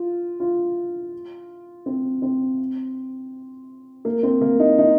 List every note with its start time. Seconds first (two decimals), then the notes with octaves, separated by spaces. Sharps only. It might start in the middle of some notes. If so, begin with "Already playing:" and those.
Already playing: F4
0.40 F4
1.86 C4
2.22 C4
4.05 A#3
4.23 C4
4.41 A#3
4.60 D#4
4.78 D#4